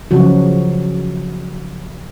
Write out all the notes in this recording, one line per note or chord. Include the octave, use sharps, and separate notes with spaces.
C#3 F3 F#3 F#4